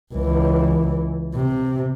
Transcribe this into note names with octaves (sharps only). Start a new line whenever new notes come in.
C#2 E3
C3